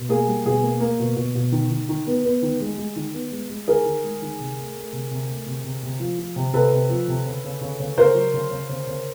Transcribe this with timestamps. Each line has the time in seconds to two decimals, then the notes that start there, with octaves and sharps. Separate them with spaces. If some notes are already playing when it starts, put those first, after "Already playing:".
Already playing: B2
0.09 A#3 G#4
0.28 G3
0.46 B2 G#4
0.63 A#3
0.80 A#3
1.00 B2
1.16 B2
1.35 B2
1.52 D#3
1.71 D#3
1.89 D#3
2.07 B3
2.25 B3
2.42 D#3
2.61 G#3
2.78 G#3
2.96 D#3
3.13 B3
3.32 G#3
3.49 G#3
3.68 D#3 G#4 A#4
3.85 D#3
4.04 G#3
4.22 D#3
4.40 C3
4.57 A3
4.75 A3
4.93 C3
5.11 C3
5.29 A3
5.46 C3
5.64 C3
5.83 C3
6.00 F3
6.18 F3
6.36 C3
6.53 C3 A4 B4
6.72 C3
6.90 F3
7.08 C3
7.26 C#3
7.44 C#3
7.61 C#3
7.80 C#3
7.98 C#3 A#4 C5
8.15 F#3
8.34 C#3
8.51 C#3
8.69 C#3
8.87 C#3